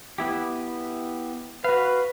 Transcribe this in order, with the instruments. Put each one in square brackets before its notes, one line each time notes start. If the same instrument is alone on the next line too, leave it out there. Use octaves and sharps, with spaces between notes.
[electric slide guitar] B3 E4 G4
[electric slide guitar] F#4 F5 [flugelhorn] B4